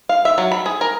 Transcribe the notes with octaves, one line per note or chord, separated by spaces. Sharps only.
F5
E5
F#3
B5
G#4
A#4